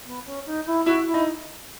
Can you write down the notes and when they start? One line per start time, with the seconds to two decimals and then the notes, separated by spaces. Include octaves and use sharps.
0.05 B3
0.25 C#4
0.46 D#4
0.66 E4
0.86 E4 F#4
1.07 E4
1.14 D#4